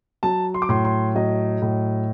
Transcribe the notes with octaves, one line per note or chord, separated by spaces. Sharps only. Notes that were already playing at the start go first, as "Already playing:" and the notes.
F#3 A5
C6
D6
A2 C6
C6
F#3 D#5
A2